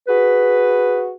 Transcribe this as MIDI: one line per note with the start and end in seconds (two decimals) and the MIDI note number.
0.07 1.11 66
0.07 1.11 68
0.07 1.11 71